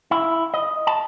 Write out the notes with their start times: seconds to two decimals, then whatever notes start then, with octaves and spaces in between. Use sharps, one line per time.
0.11 E4
0.54 D#5
0.87 A5